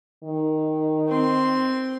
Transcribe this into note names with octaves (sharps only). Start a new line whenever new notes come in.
D#3
C4 C6